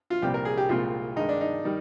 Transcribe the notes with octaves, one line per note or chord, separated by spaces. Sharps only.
F4
C2 A#2 G3 C4 G4
A#4
G#4
G4
C2 A#2 G#3 C4 F4
G2 D#3 G#3 D#4
D4
D#4
D#3 G3